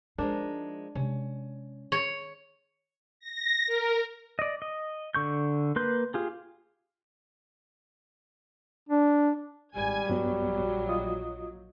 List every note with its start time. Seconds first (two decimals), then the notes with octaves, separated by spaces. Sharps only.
0.18 F3 G#3 D4 D#4 A#4
0.95 C3 G#3 C#4
1.92 C#5
3.20 A#6
3.67 A#4
4.39 D5 D#5
4.62 D#5
5.15 D3 C#6 G6
5.76 A#3 B4 C6 G6
6.14 F4 G4 G#4
8.89 D4
9.77 G#1 G3 G#5 G#6
10.10 A#1 G2 F#3 B3
10.89 F4 D#5 D#6